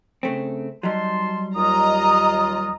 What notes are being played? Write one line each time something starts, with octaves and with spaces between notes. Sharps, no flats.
C#3 A3 C4
F#3 G3 D#4 A5 C6
D#2 F4 D#5 A#5 D#6